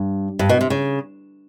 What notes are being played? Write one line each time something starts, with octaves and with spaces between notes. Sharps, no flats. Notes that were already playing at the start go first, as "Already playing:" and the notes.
Already playing: G2
G2
B2
C3
C#3